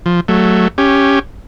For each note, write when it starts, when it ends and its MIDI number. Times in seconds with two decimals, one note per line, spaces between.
0.06 0.20 53
0.28 0.68 54
0.28 0.68 57
0.78 1.19 61
0.78 1.19 67